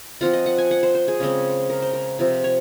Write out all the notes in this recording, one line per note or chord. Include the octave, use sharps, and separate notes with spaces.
F3 C4 F4 F#5
D#5
F#5
G#5
F#5
C5
C5
G#4
C#3 G#3 C4
A#4
C5
A#4
C3 F3 C4
C#5